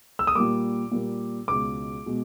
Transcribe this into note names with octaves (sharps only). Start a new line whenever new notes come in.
E6
D#6
A#2 G3 A#3 D6
A#2 G3 A#3
C#2 B2 G#3 D6
B2 G#3